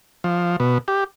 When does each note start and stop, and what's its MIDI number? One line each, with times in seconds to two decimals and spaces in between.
0.24 0.56 53
0.60 0.78 47
0.88 1.04 67